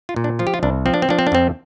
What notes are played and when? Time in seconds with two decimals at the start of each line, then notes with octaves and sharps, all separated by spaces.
0.09 F4
0.16 A#2
0.24 D4
0.39 F3 F4
0.47 G4
0.54 F4
0.63 C2 D4
0.86 F3 C4
0.94 D4
1.02 C4
1.09 F3 D4
1.19 C4
1.27 D4
1.32 F2 C4